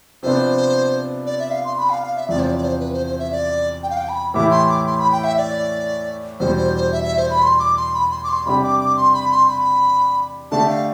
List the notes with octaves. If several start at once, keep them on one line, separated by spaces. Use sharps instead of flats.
C3 F3 B3 D4 C5
D5
E5
F5
C6
B5
F5
F5
E5
E2 C3 F3 D5
C5
D5
D5
C5
B4
C5
C5
E5
D5
G5
F5
G5
B5
A2 E3 A3 E4 G4 D6
C6
D6
C6
B5
G5
E5
D5
E2 B2 G3 D4 C5
C5
C5
E5
E5
C5
B5
C6
D6
C6
B5
C6
D6
C6
C3 G3 D4 G4 B5
D6
D6
C6
B5
C6
B5
D3 A3 D4 G4 A5
F5